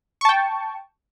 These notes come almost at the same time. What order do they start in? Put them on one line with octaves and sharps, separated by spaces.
C#6 A5 G5